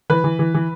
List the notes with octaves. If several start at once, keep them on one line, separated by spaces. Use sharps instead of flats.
E3 B4
E3
E3
E3